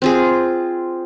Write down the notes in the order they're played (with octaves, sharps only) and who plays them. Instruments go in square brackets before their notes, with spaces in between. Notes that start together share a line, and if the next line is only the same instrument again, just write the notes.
[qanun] C4 F4 G#4